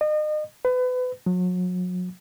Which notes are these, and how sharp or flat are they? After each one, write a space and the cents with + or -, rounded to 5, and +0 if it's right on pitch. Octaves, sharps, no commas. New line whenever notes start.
D#5 -35
B4 +30
F#3 -35